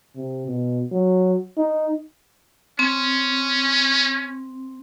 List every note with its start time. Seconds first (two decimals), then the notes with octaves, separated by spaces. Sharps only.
0.16 C3
0.48 B2
0.92 F#3
1.58 D#4
2.79 C4 C#4